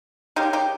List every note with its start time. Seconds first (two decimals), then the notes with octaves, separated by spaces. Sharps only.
0.36 C#3 G3 A#3 D#4 G4
0.53 D#4 G4